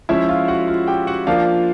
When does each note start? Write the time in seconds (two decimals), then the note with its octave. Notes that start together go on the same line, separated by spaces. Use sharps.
0.09 F3 G#3 C#4 E4 E5
0.28 F4 F5
0.48 F#4 F#5
0.68 F4 F5
0.87 G4 G5
1.07 F#4 F#5
1.27 F3 A#3 D4 F4 F5